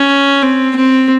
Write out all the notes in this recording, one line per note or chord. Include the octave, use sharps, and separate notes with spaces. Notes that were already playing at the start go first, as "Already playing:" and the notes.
Already playing: C#4
C4
C4